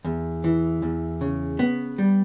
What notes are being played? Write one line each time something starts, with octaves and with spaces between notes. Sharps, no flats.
E2
E3
E2
C#3
B3
G3